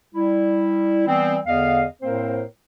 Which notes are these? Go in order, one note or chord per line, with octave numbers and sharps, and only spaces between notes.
G3 E4
E3 G3 B3 C4
E2 D3 B3 D#5 F5
A2 A#3 C4 A#4 C5